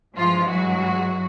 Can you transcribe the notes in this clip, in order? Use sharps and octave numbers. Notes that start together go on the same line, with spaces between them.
G2 E3 F3 G#3 F4
F#3 F#4